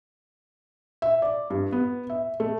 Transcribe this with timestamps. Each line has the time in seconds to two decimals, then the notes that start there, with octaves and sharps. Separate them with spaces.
1.02 E5
1.22 D5
1.50 G2
1.73 B3
2.10 E5
2.40 A3